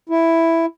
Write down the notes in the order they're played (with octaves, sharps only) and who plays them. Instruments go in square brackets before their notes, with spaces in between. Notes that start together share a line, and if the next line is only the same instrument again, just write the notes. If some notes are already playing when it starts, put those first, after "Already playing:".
[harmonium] E4